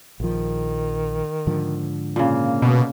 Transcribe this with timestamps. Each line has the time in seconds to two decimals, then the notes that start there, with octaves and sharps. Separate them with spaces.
0.20 A#1 D#3 F3
1.47 G#2 D3 F3
2.16 A#2 C#3 A#3
2.62 B2